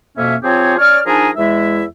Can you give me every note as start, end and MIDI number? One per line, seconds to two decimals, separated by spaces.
0.17 0.35 41
0.17 0.35 47
0.17 0.35 58
0.17 0.35 61
0.17 0.35 76
0.43 0.78 53
0.43 0.78 60
0.43 0.78 65
0.43 0.78 67
0.43 0.78 68
0.43 0.78 73
0.78 1.00 61
0.78 1.00 73
0.78 1.00 74
0.78 1.00 89
1.06 1.30 53
1.06 1.30 62
1.06 1.30 63
1.06 1.30 68
1.06 1.30 70
1.06 1.30 80
1.37 1.84 40
1.37 1.84 56
1.37 1.84 64
1.37 1.84 76